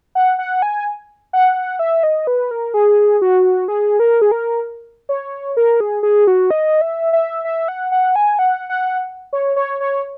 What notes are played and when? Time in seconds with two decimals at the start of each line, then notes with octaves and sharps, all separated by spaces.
0.15 F#5
0.39 F#5
0.62 G#5
1.33 F#5
1.79 E5
2.03 D#5
2.27 B4
2.51 A#4
2.74 G#4
3.22 F#4
3.68 G#4
4.00 A#4
4.22 G#4
4.31 A#4
5.09 C#5
5.57 A#4
5.80 G#4
6.03 G#4
6.27 F#4
6.51 D#5
6.81 E5
7.13 E5
7.45 E5
7.68 F#5
7.92 F#5
8.16 G#5
8.39 F#5
8.69 F#5
9.33 C#5
9.56 C#5
9.80 C#5